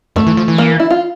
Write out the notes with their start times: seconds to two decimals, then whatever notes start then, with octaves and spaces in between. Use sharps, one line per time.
0.16 F2 A3
0.27 E3
0.37 F3
0.48 E3
0.58 A#3
0.80 E4
0.90 F4